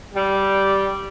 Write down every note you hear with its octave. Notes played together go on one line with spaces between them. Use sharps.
G3